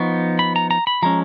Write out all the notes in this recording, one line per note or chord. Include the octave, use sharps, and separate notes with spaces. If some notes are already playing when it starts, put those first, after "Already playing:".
Already playing: F3 B3 D#4 C#6
B5
A#5
A#5
B5
F3 G#3 C#4 A#5